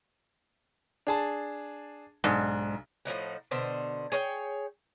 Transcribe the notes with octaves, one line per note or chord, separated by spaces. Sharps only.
D4 G#4 A5
B1 G#2 D4
A2 F3 D#4 F#5
B2 D3 C5
G#4 C#5 F5 G5